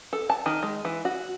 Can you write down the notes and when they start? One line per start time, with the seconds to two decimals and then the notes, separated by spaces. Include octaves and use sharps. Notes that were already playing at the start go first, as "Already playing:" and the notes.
0.13 A4
0.30 A5
0.46 D#3
0.63 G#3
0.85 E3
1.05 F#4